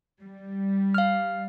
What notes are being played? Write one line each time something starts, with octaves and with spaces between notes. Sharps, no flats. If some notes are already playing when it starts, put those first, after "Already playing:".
G3
F5 F6